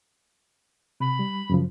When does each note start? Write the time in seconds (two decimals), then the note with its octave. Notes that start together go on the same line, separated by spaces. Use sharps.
1.00 C3 B5
1.19 G3
1.50 F#2 C#3 F3